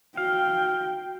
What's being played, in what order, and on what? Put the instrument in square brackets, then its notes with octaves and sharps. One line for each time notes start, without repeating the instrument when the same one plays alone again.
[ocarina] F#4 [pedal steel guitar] F5 [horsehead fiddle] G5